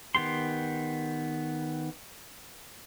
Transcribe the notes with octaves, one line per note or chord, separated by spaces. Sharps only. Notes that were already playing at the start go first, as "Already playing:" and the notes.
D#3 B3 G4 C6